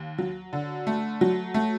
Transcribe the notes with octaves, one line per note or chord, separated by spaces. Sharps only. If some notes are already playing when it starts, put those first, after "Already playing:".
Already playing: D#2
F#3
D3
A3
F#3
A3